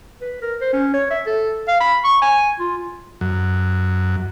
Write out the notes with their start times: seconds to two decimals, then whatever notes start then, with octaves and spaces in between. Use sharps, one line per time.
0.21 B4
0.42 A#4
0.61 C5
0.73 C#4
0.94 C#5
1.10 E5
1.26 A4
1.68 F5
1.81 B5
2.04 C#6
2.22 G#5
2.60 F4
3.21 F#2